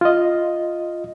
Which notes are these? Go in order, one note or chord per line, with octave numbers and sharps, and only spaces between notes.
F4 D#5